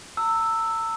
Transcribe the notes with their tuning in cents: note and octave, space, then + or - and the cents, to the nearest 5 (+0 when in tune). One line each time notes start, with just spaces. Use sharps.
A#5 -45 E6 +0